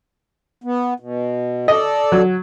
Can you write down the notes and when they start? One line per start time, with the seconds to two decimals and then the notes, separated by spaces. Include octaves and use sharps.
0.64 B3
1.00 B2
1.68 A4 D5 D#5
2.12 F#3